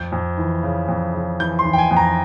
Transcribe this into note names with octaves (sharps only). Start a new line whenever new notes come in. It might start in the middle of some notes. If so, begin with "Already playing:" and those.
Already playing: F2 G6
F2
E3
C#3
F2
C#3
E3 G6
C6
E3
G5
G#5
F2
A#5